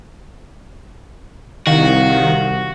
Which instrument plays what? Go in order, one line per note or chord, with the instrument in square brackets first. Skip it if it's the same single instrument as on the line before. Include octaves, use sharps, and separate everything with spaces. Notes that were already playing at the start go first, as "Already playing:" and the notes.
[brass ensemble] C2 [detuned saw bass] D#3 [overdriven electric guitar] F#4 [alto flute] F5